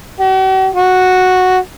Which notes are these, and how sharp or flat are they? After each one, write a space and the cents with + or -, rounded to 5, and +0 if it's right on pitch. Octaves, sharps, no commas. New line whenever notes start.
F#4 +45
F#4 -5